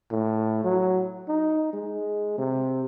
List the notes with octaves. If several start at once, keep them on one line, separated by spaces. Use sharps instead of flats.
A2
F#3
D#4
G#3
C3